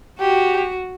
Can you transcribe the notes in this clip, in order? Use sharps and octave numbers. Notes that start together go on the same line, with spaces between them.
F#4 G4